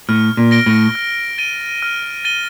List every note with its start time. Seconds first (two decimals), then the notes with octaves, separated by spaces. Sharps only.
0.09 A2 F6
0.37 A#2
0.51 A#6 D7 G7
0.66 A2
0.95 F6
1.38 A6 D#7 G7
1.82 F6
2.25 A6 D#7 G7